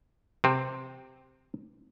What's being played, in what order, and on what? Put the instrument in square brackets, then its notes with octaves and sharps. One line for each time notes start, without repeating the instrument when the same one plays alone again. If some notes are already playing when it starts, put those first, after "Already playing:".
[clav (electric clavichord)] C3 C4